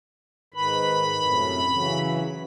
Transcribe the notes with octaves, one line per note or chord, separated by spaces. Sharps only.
G#2 D#3 B4 B5
F#2 A2 C3
C#3 E3 F#3